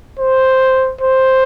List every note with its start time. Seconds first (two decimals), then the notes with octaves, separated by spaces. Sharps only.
0.19 C5
1.01 C5